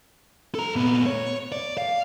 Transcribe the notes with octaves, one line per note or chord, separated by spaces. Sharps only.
A4 A#5
A#2 B3
C#5
D5
F5